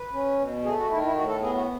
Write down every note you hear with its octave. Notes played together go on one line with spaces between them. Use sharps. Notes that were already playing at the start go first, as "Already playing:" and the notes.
Already playing: B4
C#4
B2
A3 G#4
F#4
D#3 E4
E4
A2 F#4
A4
B3 G#4
F#4